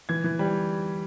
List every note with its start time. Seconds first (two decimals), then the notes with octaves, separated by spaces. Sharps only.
0.09 E3 G#6
0.24 E3
0.39 G3